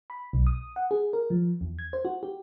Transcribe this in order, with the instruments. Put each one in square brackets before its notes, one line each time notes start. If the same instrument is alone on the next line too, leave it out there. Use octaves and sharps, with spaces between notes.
[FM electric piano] B5
B1
D#6
F#5
G#4
A#4
F3
E2
G#6
C5
F#4
G4